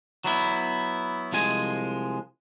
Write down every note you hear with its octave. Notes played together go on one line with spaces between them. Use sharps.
F#3 B3 E4
C2 F3 G#3 G#5